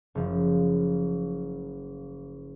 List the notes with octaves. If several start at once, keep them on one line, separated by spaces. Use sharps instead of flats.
F#1 F3